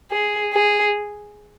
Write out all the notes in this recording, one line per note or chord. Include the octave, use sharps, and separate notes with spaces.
G#4
G#4